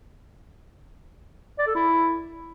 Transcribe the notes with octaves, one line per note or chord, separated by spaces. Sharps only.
D5
A4
E4